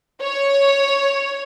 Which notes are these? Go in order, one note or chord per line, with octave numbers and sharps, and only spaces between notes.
C#5